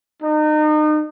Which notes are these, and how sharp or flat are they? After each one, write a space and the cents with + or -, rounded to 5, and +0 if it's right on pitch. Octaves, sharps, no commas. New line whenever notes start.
D#4 -35